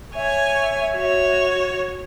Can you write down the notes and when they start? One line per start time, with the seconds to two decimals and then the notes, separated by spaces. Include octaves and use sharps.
0.15 C#5 E5 G#5
0.93 F#4 C#5